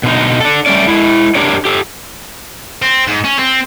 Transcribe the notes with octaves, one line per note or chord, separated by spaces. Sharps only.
B2 D3 D#4
D4 A4
G3 A3 C#4 D5
G#3 E4
D4 G4 A#4 C#5 D5
G4 A4
C4
G#2
C#4
C4